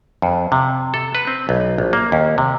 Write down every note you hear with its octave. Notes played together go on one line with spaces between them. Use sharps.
F2
C3
A4
B4
C4
B1
A#1
A#3
D#2
C3